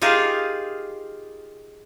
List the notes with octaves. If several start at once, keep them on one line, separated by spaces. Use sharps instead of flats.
D#4 F4 G4 G#4 A#4